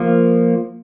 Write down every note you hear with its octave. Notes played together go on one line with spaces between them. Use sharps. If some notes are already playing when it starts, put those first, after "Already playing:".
Already playing: F3 A#3